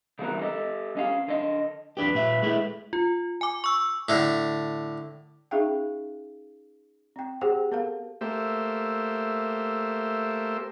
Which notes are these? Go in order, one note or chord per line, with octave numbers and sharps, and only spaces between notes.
C#3 E3 G3 B3 F#4 A#4
G4 A4 D#5
D2 C#4 F5
D3 D#5
F2 D4 G4 B4
A#2 E5
G#3 A3 E4
F4
G#5 D6
C#6 E6
A2 D3
C#4 D#4 G#4 E5 F5 G5
C4 G5
G4 G#4 C5 F#5 G5
B3 A4 A#4 F5
A3 A#3 G4 C5 E5